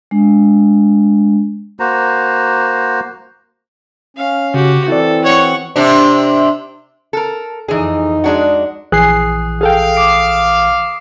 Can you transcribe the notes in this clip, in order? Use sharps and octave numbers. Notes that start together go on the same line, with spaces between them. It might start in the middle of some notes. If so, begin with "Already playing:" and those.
G#3 D4
A#3 F#4 C5 A#5
C#4 F5
C#3 F#4 G4
E3 C4 E4 A4 D5
C#5 F#5 C#6
C3 D4
A4 A#4
F2 E3 D#4 G#4
G#3 D4 F#4
A#1 E3 G#4 G#5 D#6 F#6 C7
G#4 A4 F5 G5
D6 C7 D7